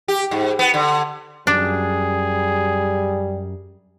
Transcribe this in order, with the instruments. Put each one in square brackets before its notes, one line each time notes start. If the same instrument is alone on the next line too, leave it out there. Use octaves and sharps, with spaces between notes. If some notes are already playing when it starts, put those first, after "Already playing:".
[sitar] G4
G#2
B3
D3
[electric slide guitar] F#2 [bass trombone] G3 [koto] D4 [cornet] G#4